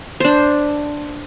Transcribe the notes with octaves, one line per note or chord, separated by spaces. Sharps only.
D4 C5